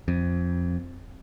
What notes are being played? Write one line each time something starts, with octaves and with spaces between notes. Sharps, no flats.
F2